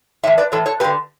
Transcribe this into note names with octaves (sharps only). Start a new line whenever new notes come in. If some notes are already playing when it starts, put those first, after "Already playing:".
A2 E3 C#5 E5
B4 D5
A2 E3 A4 C#5
A4 C#5
G2 D3 G4 B4